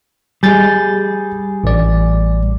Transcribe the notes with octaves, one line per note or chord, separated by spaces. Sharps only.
G3 G#4 G#5 G6 A6
A1 D5